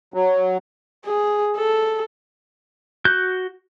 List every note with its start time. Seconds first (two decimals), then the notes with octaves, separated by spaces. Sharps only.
0.14 F#3
1.05 G#4
1.57 A4
3.05 F#4 F#6 G6